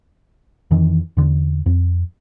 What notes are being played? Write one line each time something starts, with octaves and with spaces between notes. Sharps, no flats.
F2 D#3 E3
E2 D3
F2